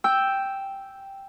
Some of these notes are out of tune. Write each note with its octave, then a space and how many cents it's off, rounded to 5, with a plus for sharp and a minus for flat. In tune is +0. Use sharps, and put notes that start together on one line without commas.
G5 +0 E6 +0